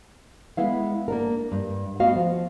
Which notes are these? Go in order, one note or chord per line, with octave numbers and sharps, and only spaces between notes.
G#3 B3 E4 F5
A#3 D4 A#4
G2
A3 B3 F#4 D#5 F5
F3